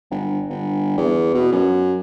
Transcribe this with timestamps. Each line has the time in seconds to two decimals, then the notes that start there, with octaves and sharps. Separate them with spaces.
0.11 G1
0.50 G1
0.97 E2
1.34 B2
1.52 F#2